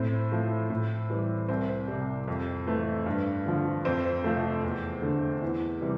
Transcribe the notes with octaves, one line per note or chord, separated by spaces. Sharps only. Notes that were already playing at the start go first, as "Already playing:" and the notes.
Already playing: A2 C4
F3 A3
A2
E3 G3
C2 C4
C3 G3
F2
E3 A3
G2
D3 F3
F2 C4
C3 F3 A3
E2
D3 A3
E2 E4
C3 E3 G3